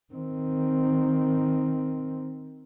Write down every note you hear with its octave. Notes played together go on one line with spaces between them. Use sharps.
D#3 C4